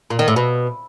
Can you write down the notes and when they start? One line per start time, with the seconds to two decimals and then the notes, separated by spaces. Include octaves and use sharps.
0.10 A#2
0.19 D#3
0.28 A2
0.36 B2